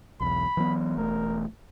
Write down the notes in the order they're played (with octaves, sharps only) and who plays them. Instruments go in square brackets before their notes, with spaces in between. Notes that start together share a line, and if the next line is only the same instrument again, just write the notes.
[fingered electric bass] B1 E2 [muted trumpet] B5
[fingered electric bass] E3 F#3 B3
[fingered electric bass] E1 E2 A3 [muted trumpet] A#4